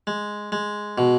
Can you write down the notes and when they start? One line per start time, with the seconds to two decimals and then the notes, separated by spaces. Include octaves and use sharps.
0.07 G#3
0.52 G#3
0.98 B2